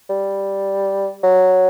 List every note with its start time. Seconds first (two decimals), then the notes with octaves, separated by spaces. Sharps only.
0.09 G3
1.23 F#3